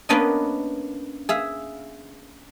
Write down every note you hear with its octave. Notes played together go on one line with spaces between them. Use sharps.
A#3 B3 C#4 D4 D5 D#5
G#4 E5 F5